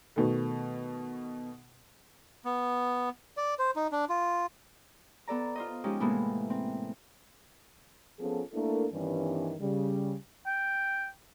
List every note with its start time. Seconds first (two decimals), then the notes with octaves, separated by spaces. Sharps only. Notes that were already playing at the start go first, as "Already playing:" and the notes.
0.16 B2 D#3 A3
2.45 B3
3.37 D5
3.59 C5
3.76 D#4
3.92 D4
4.09 F4
5.28 B3 A4 D5 A#5
5.55 F4 C5 D#5
5.84 F3 G#3 C#4 D#4 G4
6.00 A2 C3 E3 G#3 A#3 B3
6.50 C4
8.19 F3 B3 C#4 F4 G#4 A4
8.53 A3 A#3 D4 E4 A4 A#4
8.93 G2 D#3 E3 G3 B3 C#4
9.60 C#3 G3
10.46 G5